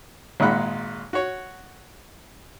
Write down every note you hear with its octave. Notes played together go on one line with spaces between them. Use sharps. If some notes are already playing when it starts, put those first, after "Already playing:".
G#1 A#2 G#3 F#5 B5
F#4 C#5